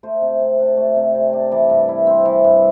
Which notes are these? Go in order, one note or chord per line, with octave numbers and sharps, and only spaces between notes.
A3 C5
C3
C3
D4
A3
C3
C3
D4
E3 D5
G2
E4
C4
E3
G2